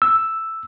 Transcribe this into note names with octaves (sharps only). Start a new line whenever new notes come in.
E6